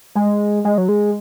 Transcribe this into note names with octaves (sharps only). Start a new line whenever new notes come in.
G#3
G#3
F#3
G#3